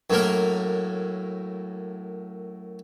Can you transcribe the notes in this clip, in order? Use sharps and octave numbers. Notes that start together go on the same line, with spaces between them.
F#2 A2 A#3 A#4